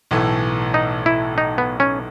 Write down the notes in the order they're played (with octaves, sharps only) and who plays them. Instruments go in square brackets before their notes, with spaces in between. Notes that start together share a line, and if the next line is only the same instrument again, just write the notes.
[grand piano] B1 A2 E3 A3
[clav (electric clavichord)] D#4
E4
D#4
B3
C#4